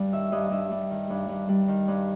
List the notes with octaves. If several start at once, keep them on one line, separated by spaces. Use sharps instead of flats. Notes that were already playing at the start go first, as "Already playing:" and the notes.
Already playing: G2 G3
D#3 E5
G2 D#5
G2 E5
G3
D#3
G2
G2
G3
D#3
G2